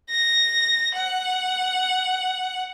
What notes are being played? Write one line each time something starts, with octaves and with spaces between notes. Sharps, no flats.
A#6
F#5